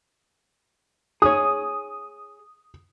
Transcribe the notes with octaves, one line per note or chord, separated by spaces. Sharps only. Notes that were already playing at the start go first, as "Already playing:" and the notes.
G#4 C#5 D#6